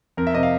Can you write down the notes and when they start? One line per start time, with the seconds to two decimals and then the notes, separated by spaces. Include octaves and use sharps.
0.17 F2 A#4
0.27 E5
0.35 C3 D#5
0.43 F5